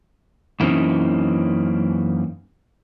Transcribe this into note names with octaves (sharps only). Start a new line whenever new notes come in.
F#2 E3 A#3 C4 C#4 D#4